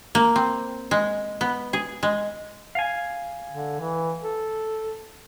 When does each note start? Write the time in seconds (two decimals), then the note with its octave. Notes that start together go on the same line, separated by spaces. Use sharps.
0.15 A#3
0.36 C4
0.91 G#3
1.41 B3
1.73 G#4
2.03 G#3
2.75 F5 G#5
3.52 D3
3.80 E3
4.22 A4